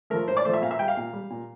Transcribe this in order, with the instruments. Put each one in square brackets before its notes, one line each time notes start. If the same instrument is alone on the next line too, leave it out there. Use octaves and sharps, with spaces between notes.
[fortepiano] F3 A3 A#4
A2 C5
D5
F3 A3 C5
E5
A#2 F5
E5
G3 G5
F5
A#2
G3
A#2